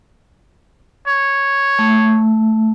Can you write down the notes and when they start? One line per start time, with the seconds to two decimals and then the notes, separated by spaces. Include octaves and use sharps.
1.07 C#5
1.79 A3